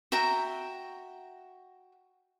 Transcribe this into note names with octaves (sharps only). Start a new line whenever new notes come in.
F#4 E5 G5 A#5